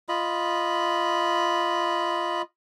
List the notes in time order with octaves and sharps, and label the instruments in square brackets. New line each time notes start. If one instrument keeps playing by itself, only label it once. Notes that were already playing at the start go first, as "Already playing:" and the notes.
[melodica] F4 D#5 B5